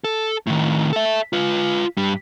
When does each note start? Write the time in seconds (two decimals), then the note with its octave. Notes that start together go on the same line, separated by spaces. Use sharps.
0.04 A4
0.47 A2 D#3
0.93 A4 E5
1.33 F4 B4
1.97 G2 G3